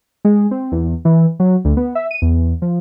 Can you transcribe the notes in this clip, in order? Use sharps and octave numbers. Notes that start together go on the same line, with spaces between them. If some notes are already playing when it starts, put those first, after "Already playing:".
G#3
C4
E2
E3
F#3
D2
B3
E5
D#7
E2
F3